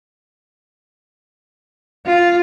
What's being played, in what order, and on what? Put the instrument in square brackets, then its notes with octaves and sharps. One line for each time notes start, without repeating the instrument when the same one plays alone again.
[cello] F4